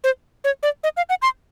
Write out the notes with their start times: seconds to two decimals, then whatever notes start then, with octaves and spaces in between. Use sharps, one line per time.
0.04 C5
0.44 C#5
0.63 D5
0.84 D#5
0.97 F5
1.09 F#5
1.22 C6